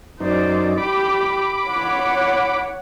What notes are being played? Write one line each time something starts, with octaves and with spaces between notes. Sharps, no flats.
F#2 D#4 C5 D5
G4 B5 D6
C#5 F#5